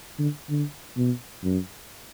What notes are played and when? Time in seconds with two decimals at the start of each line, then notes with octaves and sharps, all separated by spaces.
0.19 D3
0.49 D3
0.97 B2
1.43 F#2